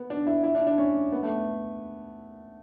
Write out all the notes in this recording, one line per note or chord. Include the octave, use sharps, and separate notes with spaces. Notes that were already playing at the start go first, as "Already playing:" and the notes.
Already playing: B3
D4
E4
E4
D4
D4
C#4
B3
A3